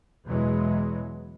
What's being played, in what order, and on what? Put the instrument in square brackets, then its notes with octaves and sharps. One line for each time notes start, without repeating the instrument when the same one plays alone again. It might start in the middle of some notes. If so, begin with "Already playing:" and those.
[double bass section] E2 B2 E3 F#3 G#3